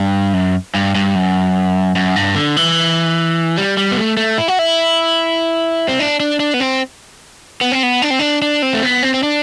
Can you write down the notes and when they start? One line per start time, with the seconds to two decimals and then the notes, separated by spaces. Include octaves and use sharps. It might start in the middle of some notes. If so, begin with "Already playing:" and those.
Already playing: G2
0.33 F#2
0.74 G2
0.95 G2
1.15 F#2
1.96 F#2
2.16 G2
2.36 D3
2.57 E3
3.57 G3
3.77 G3
3.92 B3
3.97 A3
4.17 A3
4.38 E4
4.48 F#4
4.59 E4
5.88 C4
5.99 D4
6.20 D4
6.40 D4
6.54 B3
6.60 C4
7.61 B3
7.72 C4
7.83 B3
8.02 D4
8.10 C4
8.19 D4
8.42 D4
8.62 C4
8.74 A3
8.83 B3
9.03 C4
9.14 C4
9.23 D4